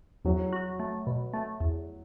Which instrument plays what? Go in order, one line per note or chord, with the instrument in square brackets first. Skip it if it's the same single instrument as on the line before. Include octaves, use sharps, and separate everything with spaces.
[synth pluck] E2 [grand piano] F#3
[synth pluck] F#4
A3
B2
A3
E2